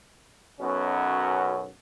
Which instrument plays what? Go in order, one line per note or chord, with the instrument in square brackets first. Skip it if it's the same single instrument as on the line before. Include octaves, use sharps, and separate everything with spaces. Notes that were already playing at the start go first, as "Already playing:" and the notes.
[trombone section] B1 F#2 B2 F#3 C#4 F#4